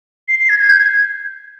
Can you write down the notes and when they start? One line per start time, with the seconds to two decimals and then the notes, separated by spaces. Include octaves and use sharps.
0.28 C7
0.39 C7
0.49 G#6
0.59 G#6
0.70 G6
0.80 G#6